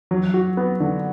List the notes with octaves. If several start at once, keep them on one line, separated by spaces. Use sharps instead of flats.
F#3
F#4
B3
D3